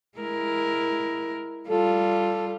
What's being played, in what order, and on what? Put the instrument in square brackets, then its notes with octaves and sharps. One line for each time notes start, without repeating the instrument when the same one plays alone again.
[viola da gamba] G#3 E4 A#4
[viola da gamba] G3 F4 [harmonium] A4